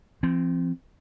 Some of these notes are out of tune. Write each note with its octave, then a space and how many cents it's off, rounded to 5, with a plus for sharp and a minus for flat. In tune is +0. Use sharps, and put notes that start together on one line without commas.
F3 -40 C4 +0